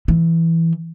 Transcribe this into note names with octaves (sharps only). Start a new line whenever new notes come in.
E3